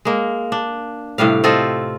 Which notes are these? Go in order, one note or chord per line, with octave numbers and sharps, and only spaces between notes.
G#3 A#3
D4
A2 C3 G3 F5
C4 F4 A4 D#5